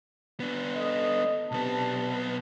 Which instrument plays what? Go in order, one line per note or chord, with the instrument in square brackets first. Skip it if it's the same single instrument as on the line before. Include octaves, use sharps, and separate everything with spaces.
[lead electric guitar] B3 D4
[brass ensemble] A4 D#5
[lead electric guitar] B1 B3 [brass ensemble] C3 D4 A5